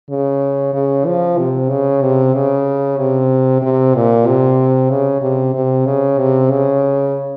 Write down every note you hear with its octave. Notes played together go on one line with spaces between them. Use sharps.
C#3
C#3
F3
C3
C#3
C3
C#3
C3
C3
A#2
C3
C#3
C3
C3
C#3
C3
C#3